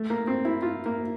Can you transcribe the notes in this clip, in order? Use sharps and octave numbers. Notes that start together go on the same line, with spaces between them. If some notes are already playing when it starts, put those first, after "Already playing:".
Already playing: A3
A#3
C4
E4
F4
A#3